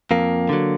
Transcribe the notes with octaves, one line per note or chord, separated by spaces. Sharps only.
F2 A#3
D3 F#3